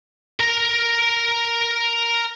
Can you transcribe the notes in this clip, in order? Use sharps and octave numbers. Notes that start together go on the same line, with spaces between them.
A#4 A#5